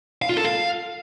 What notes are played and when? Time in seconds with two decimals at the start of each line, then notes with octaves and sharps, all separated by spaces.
0.22 F5
0.29 F4
0.37 A4
0.44 F5